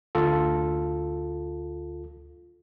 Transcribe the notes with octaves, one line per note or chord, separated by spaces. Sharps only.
D2 F4 A4